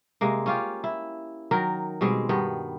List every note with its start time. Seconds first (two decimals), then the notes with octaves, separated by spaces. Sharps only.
0.21 C3 G#3 A#3
0.46 C#4 F4 G4
0.84 E4
1.51 D#3 F#3 A#4
2.01 B2 G3 G#3 C4
2.29 G2 D#3 B3